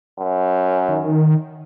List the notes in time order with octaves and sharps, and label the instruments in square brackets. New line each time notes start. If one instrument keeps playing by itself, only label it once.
[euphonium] F#2
[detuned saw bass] D#3